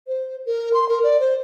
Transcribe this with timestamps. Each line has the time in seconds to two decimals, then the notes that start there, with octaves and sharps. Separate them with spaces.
0.07 C5
0.46 A#4
0.74 C6
0.89 A#4
1.03 D5
1.20 C5